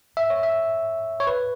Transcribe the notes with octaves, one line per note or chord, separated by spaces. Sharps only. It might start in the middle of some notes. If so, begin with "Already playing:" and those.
E5
C#5
E5
C#5
B4